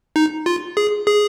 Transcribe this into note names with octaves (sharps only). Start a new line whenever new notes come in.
D#4
F4
G#4
G#4